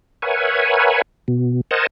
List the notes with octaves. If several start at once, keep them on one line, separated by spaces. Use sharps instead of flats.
A#4 B4 C#5 E5 F#5 G#5
B2
A#4 C5 D#5 F#5 G#5 A5